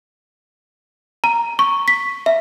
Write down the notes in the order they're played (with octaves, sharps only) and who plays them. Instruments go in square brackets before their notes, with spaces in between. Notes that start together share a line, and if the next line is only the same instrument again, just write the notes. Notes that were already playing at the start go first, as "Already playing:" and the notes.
[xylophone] A#5
C#6
B6
E5